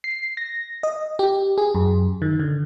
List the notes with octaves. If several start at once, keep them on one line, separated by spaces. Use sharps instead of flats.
C7
A#6
D#5
G4
G#4
F#2
D#3
D3